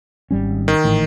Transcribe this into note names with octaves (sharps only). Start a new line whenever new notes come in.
G#1 G3 C#4
D#3
G#1 A2 E3